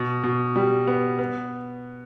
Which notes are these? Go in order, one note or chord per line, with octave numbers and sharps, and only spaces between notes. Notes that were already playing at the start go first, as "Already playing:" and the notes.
Already playing: B2
B2
G3
B3
B3